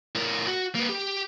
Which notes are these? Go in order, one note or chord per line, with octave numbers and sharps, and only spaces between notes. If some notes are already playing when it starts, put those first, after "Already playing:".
A2 A#4
F#4
A#3 B4
G4